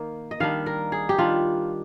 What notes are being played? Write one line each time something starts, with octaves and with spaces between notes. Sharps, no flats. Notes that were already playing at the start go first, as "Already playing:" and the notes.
Already playing: D#3 A#3 D#4
D#5
D#3 G3 D4 F5
A#4
G#4
G4
D#3 G3 D4 F4